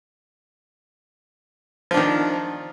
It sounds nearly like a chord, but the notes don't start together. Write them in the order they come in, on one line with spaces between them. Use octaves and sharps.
F3 D4 D#3